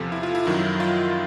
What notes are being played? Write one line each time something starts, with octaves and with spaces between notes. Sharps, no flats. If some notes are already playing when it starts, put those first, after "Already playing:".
Already playing: E2 C3 F3 A4
E4
F4
E4
F#2 D#3 F#3 E4
F4